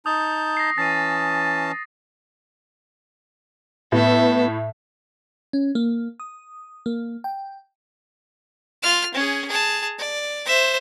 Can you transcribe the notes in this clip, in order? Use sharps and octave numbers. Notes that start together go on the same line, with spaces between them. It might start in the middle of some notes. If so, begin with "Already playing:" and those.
D#4 A5 D#6 G6
A#6 C7
E3 C#4 A5 A6 D#7
A2 B3 A4 E5
C#4
A#3
D#6
A#3
G5
F4 F6
C#4 G#4
G#4 A5
D5
C5 E5